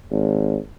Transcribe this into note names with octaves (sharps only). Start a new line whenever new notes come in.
G#1